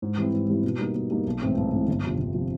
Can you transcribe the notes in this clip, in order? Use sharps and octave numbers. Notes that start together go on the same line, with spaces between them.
G#2
E3 G3 C4 E4
G#2
E3 G3 C4 E4
B2
G3 A#3 D#4
B2
G3 A#3 D#4
B1
A2 E3 G#3 C4
B1
A2 E3 G#3 C4
G1
F2 C3 F3
G1
C3 F3